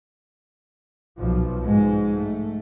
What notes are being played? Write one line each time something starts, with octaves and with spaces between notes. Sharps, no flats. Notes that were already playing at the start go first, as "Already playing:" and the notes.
B1 F3
G#2 G#3
A3